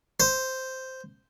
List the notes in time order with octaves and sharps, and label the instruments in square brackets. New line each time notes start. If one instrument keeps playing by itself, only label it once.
[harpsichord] C5